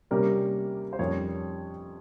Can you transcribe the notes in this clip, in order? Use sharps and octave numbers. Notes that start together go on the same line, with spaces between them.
C3 G3 A#3 C#4 A#4
C5
F2 D#3 G3 C#4 C#5